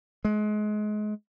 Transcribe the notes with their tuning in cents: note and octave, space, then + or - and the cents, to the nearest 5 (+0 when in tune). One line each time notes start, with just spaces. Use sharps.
G#3 +30